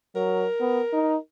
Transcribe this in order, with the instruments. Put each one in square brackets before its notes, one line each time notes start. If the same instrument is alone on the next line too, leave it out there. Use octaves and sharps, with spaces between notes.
[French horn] F#3 [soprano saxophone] A#4
[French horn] B3
D#4